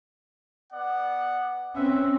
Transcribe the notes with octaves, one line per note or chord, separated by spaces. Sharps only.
B3 D5 F#5
C4 C#4 B4 E5